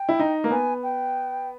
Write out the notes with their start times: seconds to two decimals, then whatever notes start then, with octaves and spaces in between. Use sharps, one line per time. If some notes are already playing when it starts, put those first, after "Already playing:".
Already playing: G5
0.09 E4
0.19 D#4
0.44 A#3
0.51 B3 G#5
0.83 G5